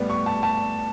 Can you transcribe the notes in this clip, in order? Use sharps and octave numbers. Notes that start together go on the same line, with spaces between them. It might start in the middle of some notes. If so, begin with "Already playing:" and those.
Already playing: A2 G3 B3
C#6
A5
A5